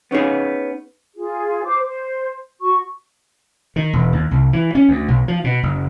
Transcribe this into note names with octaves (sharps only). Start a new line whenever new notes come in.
B3 C#4 D#4 G#4
F4 G#4
C5 D6
C5
F#4 C#6
D#3
E1
D#2
C2
E3
C#4
D2
B1
F3
B2
F#1